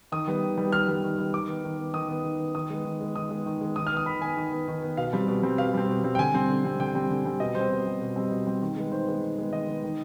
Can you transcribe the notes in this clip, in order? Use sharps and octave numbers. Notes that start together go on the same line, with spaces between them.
D#3 D#6
G3 B3
D#3
G3 B3
D#3 F6
G3 B3
D#3
G3 B3
D#3 D6
B3
D#3
B3
D#3 D#6
B3
D#3
B3
D#3 D#6
G#3 B3
D#3
G#3 B3
D#3 D#6
G#3 B3
D#3
G#3 B3
D#3 D#6
F6
B3
D#6
D#3 B5
B3 G#5
D#3
B3
D#3
B3
B2 F5
G3 C4
B2
G3 C4
B2 F5
G3 C4
B2
G3 C4
G5
D3 G#5
G3 C4
D3
G3 C4
D3 G5
G3 C4
D3
G3 C4
B2 D#5
G3 C4 C5
B2
G3 C4
B2
G3 C4
B2
G3 C4
D#3
G#3 B3
D#3 C5
G#3 B3
D#3
G#3 B3
D#3 D#5
G#3 B3
D#3